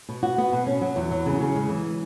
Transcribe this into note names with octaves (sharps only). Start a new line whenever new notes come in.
B2
F#4
B3
B2
C#4
F#3
E2
F#3
C#3
C#3
G#3
E3